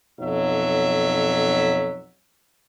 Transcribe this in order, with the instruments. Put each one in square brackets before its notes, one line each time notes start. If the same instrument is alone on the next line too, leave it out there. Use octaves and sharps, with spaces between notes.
[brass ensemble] B1 F2 F#3 E5